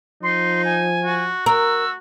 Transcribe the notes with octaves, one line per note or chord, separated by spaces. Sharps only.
F3 D#4 C6
G#5
F#4
F#4 A#4 E6